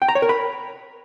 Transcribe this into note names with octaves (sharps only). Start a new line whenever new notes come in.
G5
A#5
C#5
A#4
B5